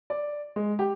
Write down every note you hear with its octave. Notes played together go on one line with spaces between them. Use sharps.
D5
G#3
G4